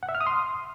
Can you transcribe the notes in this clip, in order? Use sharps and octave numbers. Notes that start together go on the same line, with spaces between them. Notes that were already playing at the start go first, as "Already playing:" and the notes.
F#5
E5
F6
D#6
C6